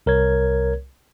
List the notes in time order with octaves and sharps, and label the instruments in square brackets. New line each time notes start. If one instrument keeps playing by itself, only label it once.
[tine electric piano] C2 A#4 C#5 G#6